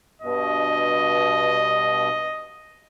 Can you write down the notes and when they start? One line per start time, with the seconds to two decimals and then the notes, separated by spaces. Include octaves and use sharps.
0.22 G2 B2 D#5